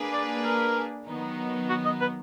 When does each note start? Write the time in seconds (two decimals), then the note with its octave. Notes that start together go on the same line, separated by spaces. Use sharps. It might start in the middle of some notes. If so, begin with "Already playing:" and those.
Already playing: A#3 D4 G#4 B4
0.13 D5
0.44 A#4
1.06 D#3 F#3 B3 D#4
1.69 F#4
1.85 D#5
2.01 B4